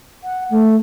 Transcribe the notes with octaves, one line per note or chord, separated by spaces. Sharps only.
F#5
A3